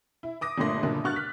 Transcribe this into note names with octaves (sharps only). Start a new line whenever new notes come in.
E4
D6 D#6 A#6
G1 G2 A#2 A3 C6 A#6
F#1 F#2 A#2 D3 D4
G2 F#4 C#6 F6 F#6 A6
B6